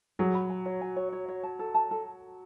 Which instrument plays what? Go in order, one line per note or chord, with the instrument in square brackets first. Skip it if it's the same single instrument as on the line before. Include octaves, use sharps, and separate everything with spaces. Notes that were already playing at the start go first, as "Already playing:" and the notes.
[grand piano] F#3 [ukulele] G#4
[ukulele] B5
G#5
C#5
G#5
C#5
C#5
C#5
A5
A4
A5
A4